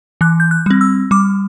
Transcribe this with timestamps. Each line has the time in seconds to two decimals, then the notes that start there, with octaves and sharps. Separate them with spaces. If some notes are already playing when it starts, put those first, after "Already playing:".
0.21 E3 F#6
0.40 G6
0.51 F#6
0.66 G3 C4
0.81 E6
1.11 G3 D6